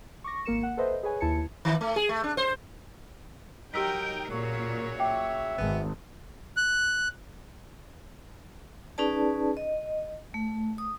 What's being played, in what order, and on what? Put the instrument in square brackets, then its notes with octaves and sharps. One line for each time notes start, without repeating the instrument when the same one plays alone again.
[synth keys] C#6 D6 A#6
G#1 A#3 A#4 C#7 E7
F#5
A4 B4 C5 D#5 E5
G#4 B4 C#5 G#5
D#2 E4 A5 G#6 C#7
[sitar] D#3
A3
G#4
A3
D4
C5
[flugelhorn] F#3 [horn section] D#4 A#4 [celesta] G4 E6 B6 [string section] G5
[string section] A#2 [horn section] C#3 F#3 C#5 [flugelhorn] A#4
[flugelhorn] E5 [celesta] G5 D6
[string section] G#1 [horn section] B3 G#4
[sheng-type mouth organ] F#6
[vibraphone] C#4 D#4 G#4 B4 D5 A5
D#5
A3
D#6